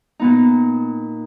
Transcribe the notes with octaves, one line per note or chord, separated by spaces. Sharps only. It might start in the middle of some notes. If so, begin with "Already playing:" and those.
A#2 B3 D#4